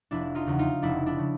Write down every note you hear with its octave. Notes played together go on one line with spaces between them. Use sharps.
F1 D4 E4
D#4 F4
E2 C#3
D#4 F4
F1 D4 E4
D4 E4
C#3